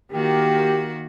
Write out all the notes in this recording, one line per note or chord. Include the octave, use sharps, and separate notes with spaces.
D#3 A#3 F#4 G4